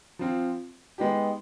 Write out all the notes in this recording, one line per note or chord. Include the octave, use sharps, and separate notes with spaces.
F3 C4 F4
G#3 B3 D#4 G4